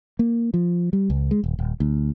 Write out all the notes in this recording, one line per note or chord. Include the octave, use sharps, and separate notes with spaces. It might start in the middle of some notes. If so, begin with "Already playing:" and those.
A#3
F3
G3
C#2
G#3
D#1
D#1
D2